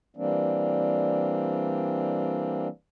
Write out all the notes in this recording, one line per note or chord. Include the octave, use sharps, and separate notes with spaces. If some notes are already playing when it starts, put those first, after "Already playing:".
E3 G3 A#3 C4 D4